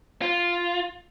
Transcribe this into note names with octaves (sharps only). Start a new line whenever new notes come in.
F4